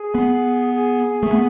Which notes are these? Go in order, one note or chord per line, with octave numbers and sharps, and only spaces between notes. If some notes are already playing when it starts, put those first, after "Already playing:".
Already playing: G#4
B3
G#4
A3
B3